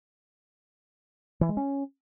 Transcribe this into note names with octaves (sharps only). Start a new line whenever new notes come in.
E3
G#3
C#4